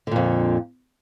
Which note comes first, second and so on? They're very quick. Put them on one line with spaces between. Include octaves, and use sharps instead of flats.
D3 A#2 F2